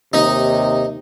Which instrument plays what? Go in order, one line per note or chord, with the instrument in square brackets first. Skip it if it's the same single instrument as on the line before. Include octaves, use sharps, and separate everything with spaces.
[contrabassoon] D#2 [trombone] C3 [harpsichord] D#4